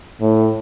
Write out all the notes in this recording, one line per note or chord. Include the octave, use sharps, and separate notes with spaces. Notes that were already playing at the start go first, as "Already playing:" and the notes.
A2